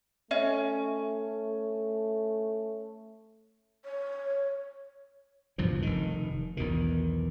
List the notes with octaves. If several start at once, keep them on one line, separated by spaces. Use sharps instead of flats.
A3 C#4 D#5 E5
C#5
C#2 G2 B2 F3
F1 D#3
B1 E2 B2 D#3